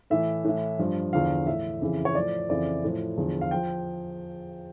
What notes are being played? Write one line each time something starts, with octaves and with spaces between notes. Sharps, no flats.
A2 E3 E5
A2 E3
G2 F3
E2 D3 F3 F5
A2 E3 E5
F2 C#3 E3
C#5
A2 F3 D5
F2 C#3 E3 D5
A2 F3
E2 D3 F3
F5
F3 G5